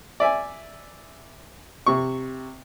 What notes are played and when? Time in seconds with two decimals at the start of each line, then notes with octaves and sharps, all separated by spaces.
0.20 D5 E5 G#5
1.87 C3 C#6